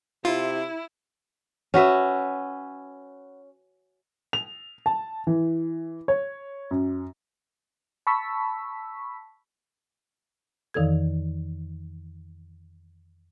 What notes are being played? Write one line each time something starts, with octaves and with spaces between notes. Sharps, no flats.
C3 E4 F4
C#4 F#4 B4 E5
F7
A5
E3
C#5
F#2
A5 B5 C#6 E6 B6
F2 D#3 E3 A4 G#6